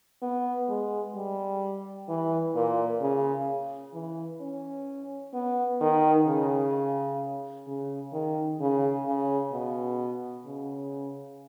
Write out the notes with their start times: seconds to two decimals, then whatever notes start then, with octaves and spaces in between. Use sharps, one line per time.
0.22 B3
0.69 G#3
1.15 G3
2.09 E3
2.55 A#2
3.01 C#3
3.94 E3
4.40 C#4
5.34 B3
5.81 D#3
6.27 C#3
7.67 C#3
8.13 D#3
8.60 C#3
9.06 C#3
9.52 B2
10.46 C#3